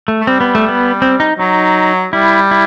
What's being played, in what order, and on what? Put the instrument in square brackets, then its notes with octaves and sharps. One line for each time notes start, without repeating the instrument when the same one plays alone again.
[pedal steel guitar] A3
[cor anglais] A3
[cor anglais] G3 [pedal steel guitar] C4
[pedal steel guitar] B3
A3
B3
C4
D#4
[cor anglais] F#3 [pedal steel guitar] D#4
[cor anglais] G3 [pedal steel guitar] E4
[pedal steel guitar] E4